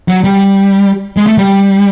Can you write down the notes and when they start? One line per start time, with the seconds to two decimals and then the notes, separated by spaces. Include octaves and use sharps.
0.08 F#3
0.24 G3
1.17 G#3
1.27 A3
1.38 G3